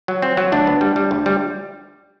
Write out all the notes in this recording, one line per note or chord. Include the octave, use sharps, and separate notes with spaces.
F#3
C4
F#3
D2 D4
B3
G3
G3
D2
G3